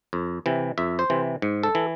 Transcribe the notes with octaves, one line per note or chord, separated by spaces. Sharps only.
F2
C3 E3
F2 E5
C5
C3 E3
G#2
A4
E3